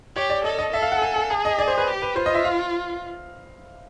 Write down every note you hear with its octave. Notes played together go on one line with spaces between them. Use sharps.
G4 C#5
D5
A4 D#5
D#5
A4 E5
F5
F#5
G#5
G#5
G#4 A5
D#5
D5
C5
B4
G4
B4
F4 C5
D#5
E5
F5